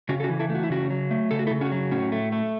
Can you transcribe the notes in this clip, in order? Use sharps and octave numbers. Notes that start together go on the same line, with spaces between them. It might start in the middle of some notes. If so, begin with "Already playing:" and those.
C#3 C#4 F#4
A4
C#4 F#4
E3
E4 A4
A3
F#4
E4
C#3 C#4 F#4
F#3
A3
C#3 A4
F#4
E4 A4
C#3
C#4 F#4
F#3
A2 C#4 F#4
A3
A3